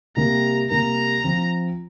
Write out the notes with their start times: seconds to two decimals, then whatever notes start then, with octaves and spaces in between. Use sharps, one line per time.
0.17 C3 G3 A#3 A#5
0.69 C3 G3 A#3 A#5
1.24 F3 C4 F4